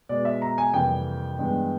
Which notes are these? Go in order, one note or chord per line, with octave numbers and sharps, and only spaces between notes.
B2 G#3 B3 D5
E5
A#5
G#5
F2 C3 E3 G3 A#3 G5
G2 E3 G#3 B3